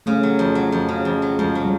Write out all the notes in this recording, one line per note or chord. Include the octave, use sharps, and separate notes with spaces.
C#3 A3
F#3
F2
F#3
F2
C#3
F2
F#3
F2 G#3
F#3
G3